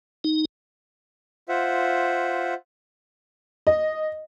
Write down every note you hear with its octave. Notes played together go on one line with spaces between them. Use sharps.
D#4
F4 C5 E5 F#5
D#5